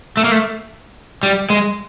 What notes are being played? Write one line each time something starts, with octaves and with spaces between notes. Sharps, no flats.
A3
A#3
A3
G3
G#3